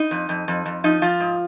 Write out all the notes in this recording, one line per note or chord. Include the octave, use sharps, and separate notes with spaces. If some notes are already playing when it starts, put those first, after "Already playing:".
Already playing: D#4
F2
F2
F2
F2
F3 D#4
F3 F4
G#2